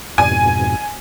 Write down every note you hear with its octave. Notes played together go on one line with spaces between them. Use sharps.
F2 G#2 B2 G#5